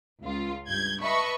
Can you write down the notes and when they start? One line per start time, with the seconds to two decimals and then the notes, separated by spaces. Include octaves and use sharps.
0.21 C#2 F4
0.67 G2 G6 G#6
1.03 B4 D#5 E5 A5 B5 C#6